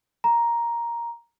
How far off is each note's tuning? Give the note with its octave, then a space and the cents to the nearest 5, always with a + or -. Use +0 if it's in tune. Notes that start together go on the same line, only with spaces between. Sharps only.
A#5 +5